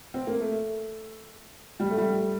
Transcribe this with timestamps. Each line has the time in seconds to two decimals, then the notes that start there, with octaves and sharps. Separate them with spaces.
0.14 C4
0.27 A#3
0.40 A3
1.80 G3
1.90 A3
1.98 G3